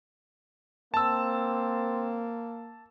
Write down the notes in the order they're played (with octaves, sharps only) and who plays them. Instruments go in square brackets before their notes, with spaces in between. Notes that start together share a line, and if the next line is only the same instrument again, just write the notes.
[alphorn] A#3 [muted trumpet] C4 [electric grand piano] A5 E6